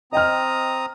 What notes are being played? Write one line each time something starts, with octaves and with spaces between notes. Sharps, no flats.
C4 D#5 G5 A#5 D#6 F6